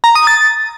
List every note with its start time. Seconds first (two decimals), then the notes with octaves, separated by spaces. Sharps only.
0.04 A#5
0.15 D#6
0.27 A6